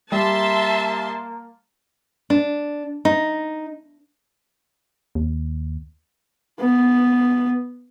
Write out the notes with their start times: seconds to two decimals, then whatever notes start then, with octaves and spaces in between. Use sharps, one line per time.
0.12 G3 A#3 E5 A5 C6
2.30 D4
3.05 D#4
5.15 D#2
6.61 B3